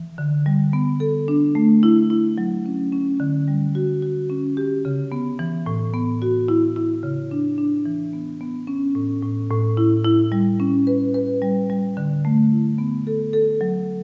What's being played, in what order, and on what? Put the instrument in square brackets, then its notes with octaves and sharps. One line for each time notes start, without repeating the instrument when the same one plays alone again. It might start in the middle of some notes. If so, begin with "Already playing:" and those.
Already playing: [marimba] E3
D3
G3
B3
A4
D4
A3
E4
E4
F#3
C#4
C#4
D3
G3
F#4
F#4
C#4
G4
C#3
B3
E3
A2
B3
F#4
E4
E4
C#3
D4
D4
E3
B3
B3
C#4
A2
A2
A2
E4
E4
G3
C#4
B4
B4
G3
G3
D3
A3
E4
B3
A4
A4
F#3